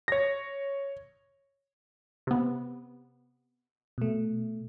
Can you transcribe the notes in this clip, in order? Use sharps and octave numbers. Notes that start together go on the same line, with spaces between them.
C#5 A#6
C3 B3
B2 A3